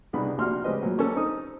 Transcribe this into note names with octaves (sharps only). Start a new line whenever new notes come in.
C2 C#3 B3 D4 D#4 B5
A#1 C3 D4 F#4 C6 F6
C#2 C#3 C4 G4 B4 D#5
A#1 F#3 G#3
A#3 C#4 G4 A4
C4 D#4 D#6